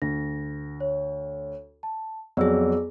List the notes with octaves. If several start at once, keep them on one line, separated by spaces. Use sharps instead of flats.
D2 A#6
C#5
A5
F2 F#3 B3 G#4 D5 E6